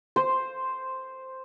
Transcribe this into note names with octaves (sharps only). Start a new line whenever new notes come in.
C5